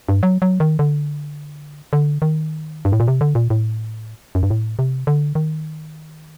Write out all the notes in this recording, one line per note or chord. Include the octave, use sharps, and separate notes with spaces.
G2
F#3
F#3
D#3
D3
D3
D#3
G2
A2
A#2
C3
D3
A#2
A2
F#2
G2
A2
C3
D3
D#3